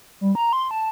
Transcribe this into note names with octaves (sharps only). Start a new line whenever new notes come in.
G3
A#5
C6
A5